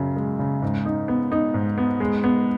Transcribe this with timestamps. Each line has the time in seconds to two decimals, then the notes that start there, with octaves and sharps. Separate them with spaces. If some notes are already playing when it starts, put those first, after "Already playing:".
Already playing: F#2 C#3
0.16 G#3
0.39 C#3
0.62 G#2
0.85 D#4
1.08 B3
1.32 D#4
1.54 G#2
1.78 B3
2.00 G#3
2.24 B3